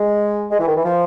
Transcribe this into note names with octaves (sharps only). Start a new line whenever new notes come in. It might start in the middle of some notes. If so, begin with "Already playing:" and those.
Already playing: G#3
G#3
E3
D#3
E3
F3